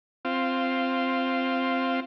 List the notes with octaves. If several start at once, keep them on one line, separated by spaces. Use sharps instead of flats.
C4 F4